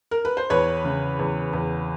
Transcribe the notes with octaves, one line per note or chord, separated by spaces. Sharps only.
A#4
B4
C5
E2 B4 C#5
C#3
E2
E2